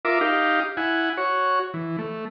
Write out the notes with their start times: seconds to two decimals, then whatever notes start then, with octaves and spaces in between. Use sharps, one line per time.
0.05 F4 A#4 E5 D6
0.21 D#4 G4 F5
0.77 E4 F#5 G#5
1.17 F#4 C#5
1.74 E3
1.98 A3